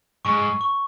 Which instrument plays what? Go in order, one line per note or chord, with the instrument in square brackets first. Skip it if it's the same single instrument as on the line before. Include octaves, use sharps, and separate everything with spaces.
[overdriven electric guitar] G#2 [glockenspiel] C#6
[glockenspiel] C#6